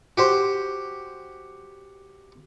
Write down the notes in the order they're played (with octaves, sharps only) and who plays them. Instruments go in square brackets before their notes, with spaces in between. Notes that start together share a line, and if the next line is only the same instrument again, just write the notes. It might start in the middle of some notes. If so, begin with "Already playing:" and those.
[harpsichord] F#4 G4 C5